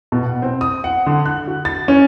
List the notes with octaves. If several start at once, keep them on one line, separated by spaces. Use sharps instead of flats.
B2
F#5
C4
D#6
F#5
D3
F#6
F#4
A6
C#4